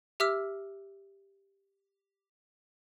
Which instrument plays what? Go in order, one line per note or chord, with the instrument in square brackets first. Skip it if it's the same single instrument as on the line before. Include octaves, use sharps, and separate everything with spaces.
[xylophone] G4 E5 D6 E6 F6 B6